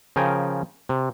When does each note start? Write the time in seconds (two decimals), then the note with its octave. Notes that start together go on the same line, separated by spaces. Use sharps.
0.16 C#3 F3 A#4 G5 G#5
0.89 C3